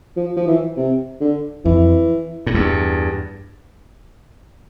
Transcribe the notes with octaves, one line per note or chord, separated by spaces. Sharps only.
F3
F3
E3
C3
D3
F2 E3
A2
E2 G2